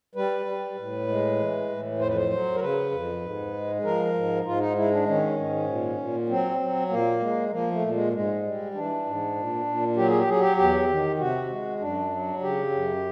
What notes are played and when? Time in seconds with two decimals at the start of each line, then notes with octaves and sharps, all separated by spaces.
0.15 G3 B4
0.46 G3
0.77 A2
1.08 G#3
1.39 E3
1.69 A2
1.99 F2 C5
2.08 B4
2.16 C5
2.30 F#3
2.55 A#4
2.61 C#3 B4
2.91 F2
3.21 G#2
3.53 G#3
3.84 F3 A#4
4.13 G#2
4.44 G#2 F4
4.59 D#4
4.75 G#3 E4
4.91 D4
5.06 D#3 C#4
5.37 G#2
5.67 A#2
5.98 A#2
6.29 F#3 C4
6.60 F#3
6.89 A#2 A#3
7.20 G#3
7.51 F3 A#3
7.72 A3
7.82 A#2
7.92 G#3
8.13 G#2 G#3
8.42 G3
8.74 E3 D4
9.05 G#2
9.35 A#2
9.65 A#2
9.96 F#3 G4
10.08 G#4
10.18 G4
10.27 F#3 G#4
10.40 G4
10.57 E2 G4
10.89 D#3
11.19 C3 F#4
11.50 G#3
11.80 F#2 D4
12.11 F#3
12.41 C#3 G4
12.72 F#2